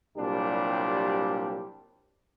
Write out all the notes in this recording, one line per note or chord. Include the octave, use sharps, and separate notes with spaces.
C2 A#2 F#3 G3 D4 G4